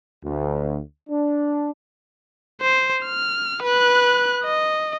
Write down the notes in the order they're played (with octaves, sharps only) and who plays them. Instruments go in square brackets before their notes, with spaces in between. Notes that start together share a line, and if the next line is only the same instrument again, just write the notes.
[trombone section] D2
D4
[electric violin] C5
F6
B4 F#6
D#5